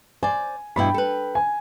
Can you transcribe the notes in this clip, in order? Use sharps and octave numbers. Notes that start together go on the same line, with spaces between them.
C5 D5 G#5
G2 B2 E4 G5 B5
A4 B4
G#5